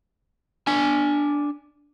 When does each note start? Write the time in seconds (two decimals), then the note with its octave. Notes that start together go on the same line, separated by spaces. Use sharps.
0.67 D4 G#5